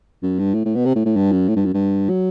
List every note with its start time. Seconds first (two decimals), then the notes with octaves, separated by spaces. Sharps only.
0.23 F#2
0.39 G2
0.54 A2
0.65 A2
0.75 B2
0.85 C3
0.95 A2
1.05 A2
1.16 G2
1.32 F#2
1.48 A2
1.56 G2
1.65 F#2
1.74 G2
2.10 F#3